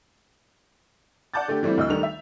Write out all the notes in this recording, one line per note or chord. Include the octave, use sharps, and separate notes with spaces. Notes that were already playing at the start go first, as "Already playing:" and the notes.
D5 F#5 A5 D6 G6 A6
D3 A3 D4 G4
E3 G3 A3 C4 E4
D2 D#5 E6
D#3 G3 A3 F7
E5